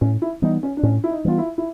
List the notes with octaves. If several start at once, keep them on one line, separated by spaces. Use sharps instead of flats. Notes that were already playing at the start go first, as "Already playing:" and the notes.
A2 C#4
E4
E3 G3 B3 D#4
C#4
D4
A2 C#4
E4
D#4
E3 G3 B3 F4
E4
E4